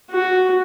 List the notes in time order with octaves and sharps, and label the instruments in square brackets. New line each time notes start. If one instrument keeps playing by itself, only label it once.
[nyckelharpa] F#4